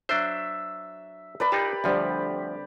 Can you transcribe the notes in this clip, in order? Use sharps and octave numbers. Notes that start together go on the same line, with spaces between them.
F#3 D4 C5 E5
A#4 B4 D5 B5
D#4 F4 G4 A5
D2 D3 F3 G3 C4